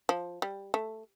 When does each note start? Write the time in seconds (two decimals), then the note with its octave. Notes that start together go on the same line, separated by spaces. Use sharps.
0.09 F3
0.42 G3
0.74 A3